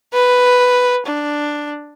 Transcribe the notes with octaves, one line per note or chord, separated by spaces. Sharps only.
B4
D4